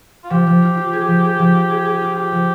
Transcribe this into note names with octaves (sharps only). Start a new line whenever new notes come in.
F4
F3 G4
F3
F4
F4
G#4
F3
G#4
F3
F4
G#4
G#4
F4
F4 G4
F3